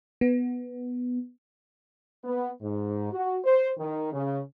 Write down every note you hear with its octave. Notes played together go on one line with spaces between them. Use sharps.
B3
B3
G#2
F#4
C5
D#3
C#3